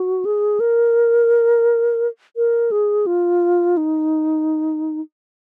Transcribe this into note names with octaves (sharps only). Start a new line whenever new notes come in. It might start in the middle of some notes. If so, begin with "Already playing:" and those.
Already playing: F#4
G#4
A#4
A#4
G#4
F4
D#4